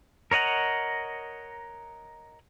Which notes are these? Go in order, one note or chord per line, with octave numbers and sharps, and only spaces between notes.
A#4 C#5 D#5 F#5 A#5